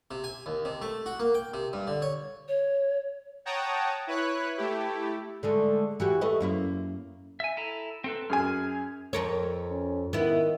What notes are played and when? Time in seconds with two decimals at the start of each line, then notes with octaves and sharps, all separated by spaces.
0.11 C3
0.24 G#5
0.46 D#2
0.65 C3
0.82 A3
1.06 F#4
1.20 A#3
1.34 G5
1.54 C3
1.73 G2
1.87 D3
2.02 C#5
2.48 C#5
3.45 C#5 F#5 G5 A5 A#5 D#6
4.07 E4 B4 C#5 F#6
4.58 A3 E4 G4
5.43 D3 G#3 A3
6.00 E3 F#4 G4
6.21 A3 B4 D#5
6.40 F#2 A#3 E4
7.40 E5 G#5
7.57 E4 A4 A#5
8.04 C4 A4 B4
8.30 F#2 G#4 G#5 F6
9.13 F2 A#4 C#5
9.71 C#4
10.13 D#3 B3 E4